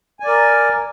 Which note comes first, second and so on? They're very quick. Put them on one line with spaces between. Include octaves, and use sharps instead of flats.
G#5 D5 A#4